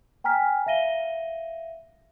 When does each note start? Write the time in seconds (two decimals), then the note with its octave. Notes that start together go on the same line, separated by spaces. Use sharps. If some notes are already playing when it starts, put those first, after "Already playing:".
0.24 G5 G#5 A#5 F6 B6
0.66 E5 F5 A#6 D#7 G7